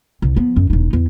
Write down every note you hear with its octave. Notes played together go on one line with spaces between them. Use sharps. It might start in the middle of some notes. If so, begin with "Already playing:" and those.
C2
F3 B3
F#2
E1 D#4
E2